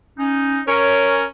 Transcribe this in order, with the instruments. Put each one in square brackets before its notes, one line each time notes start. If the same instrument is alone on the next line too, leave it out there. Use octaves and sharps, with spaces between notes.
[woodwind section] C#4 D#4
[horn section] C#4 A#4 [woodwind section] C#5